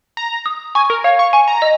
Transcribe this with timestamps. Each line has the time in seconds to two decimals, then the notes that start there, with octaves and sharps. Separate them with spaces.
0.17 A#5
0.46 D#6
0.75 G#5 C#6
0.90 A#4
1.04 C#5 F5
1.19 C#6
1.33 G#5 C#6
1.48 A#5
1.62 D#5